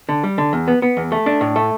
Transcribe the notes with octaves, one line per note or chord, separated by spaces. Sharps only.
D3
G3
D3
E2
B3
B3
E2
A3
D4
A2
A3